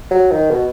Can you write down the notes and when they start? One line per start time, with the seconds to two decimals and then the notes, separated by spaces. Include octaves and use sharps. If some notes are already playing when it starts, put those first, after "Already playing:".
0.11 F#3
0.31 D#3
0.51 B2